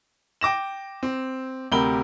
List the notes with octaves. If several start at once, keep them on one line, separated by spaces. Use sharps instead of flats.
G5 D6 A#6 E7
C4
D2 C3 G4 A#4 B5 G7